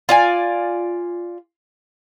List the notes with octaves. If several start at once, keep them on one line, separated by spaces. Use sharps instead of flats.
F4 D5 G#5